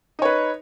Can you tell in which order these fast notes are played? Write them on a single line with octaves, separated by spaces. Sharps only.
D#4 C#5 B4